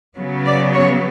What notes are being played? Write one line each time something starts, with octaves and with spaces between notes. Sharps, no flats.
C#3 F#3 B3
D5
C#5